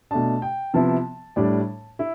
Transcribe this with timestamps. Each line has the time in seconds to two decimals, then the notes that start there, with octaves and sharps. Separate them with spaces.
0.11 B2 A3 D4 A5
0.42 G5
0.74 C3 F3 B3 E4 A5
1.36 A2 G3 D4
1.99 E4